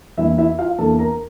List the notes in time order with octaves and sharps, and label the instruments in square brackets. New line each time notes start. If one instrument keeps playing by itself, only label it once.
[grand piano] E2 E3 A#3 D4 E4 E5
E4 E5
F4 F5
E2 E3 A#3 D4 A4 A5
A#4 A#5